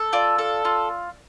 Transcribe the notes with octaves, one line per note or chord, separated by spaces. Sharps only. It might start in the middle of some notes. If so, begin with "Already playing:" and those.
Already playing: A4
F4 D5
A4
F4